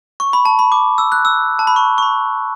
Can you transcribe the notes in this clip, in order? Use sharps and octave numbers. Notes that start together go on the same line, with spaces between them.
C#6
B5
A5
B5
D6
E6
F#6
E6
A5
B5
C#6
C#6
B5